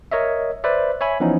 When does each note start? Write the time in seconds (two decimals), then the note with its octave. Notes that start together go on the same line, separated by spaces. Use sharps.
0.12 A#4 C#5 D#5 E5
0.64 B4 C5 D5 E5
1.01 C#5 E5 G#5 B5
1.20 E3 F3 B3 C#4 D#4